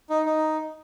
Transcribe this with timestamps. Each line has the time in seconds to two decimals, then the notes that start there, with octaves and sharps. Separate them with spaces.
0.10 D#4
0.26 D#4